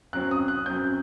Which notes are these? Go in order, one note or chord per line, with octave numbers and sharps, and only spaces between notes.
F#2 F#3 C4 F#6
D#6
F#6
F#2 F#3 C4 G6